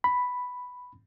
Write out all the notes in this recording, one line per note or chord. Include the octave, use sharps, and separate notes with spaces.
B5